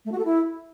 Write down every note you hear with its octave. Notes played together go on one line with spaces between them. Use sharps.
A3
F#4
A4
E4